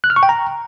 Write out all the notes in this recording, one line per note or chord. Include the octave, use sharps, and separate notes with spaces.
F#6
F6
C#6
G5
A#5